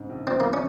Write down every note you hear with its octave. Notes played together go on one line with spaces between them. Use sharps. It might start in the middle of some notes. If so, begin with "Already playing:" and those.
Already playing: G#2 C#3 C4
A#1
F3 C4
A#3 C4
C#4